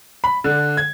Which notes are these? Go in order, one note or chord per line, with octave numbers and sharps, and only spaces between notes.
B5
D3
G#6